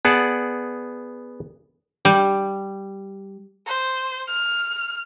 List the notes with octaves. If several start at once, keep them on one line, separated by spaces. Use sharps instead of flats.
B3 G#4 D5 F#5 A5
G3
C5
F6